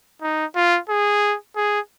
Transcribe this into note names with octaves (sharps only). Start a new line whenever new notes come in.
D#4
F4
G#4
G#4